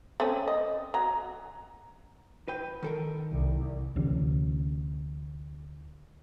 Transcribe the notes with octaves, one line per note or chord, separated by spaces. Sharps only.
A3 C4 C#4
D#5
F#3 A#5
B4 G5
D#3 A4 A#4
C2
D2 C3 E3 C#4